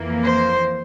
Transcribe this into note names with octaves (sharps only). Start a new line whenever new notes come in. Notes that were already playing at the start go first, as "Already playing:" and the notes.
Already playing: F2 E3 A#3
C5